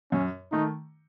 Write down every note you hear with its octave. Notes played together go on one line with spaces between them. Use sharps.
F#2 C#4
D#3 A3 D#4